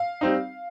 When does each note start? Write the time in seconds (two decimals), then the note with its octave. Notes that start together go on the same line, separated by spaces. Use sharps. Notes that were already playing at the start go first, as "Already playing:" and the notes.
Already playing: F5
0.21 G3 C4 D#4